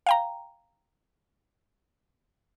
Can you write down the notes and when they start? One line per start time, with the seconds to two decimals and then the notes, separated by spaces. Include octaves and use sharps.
0.06 F5 G5 A#5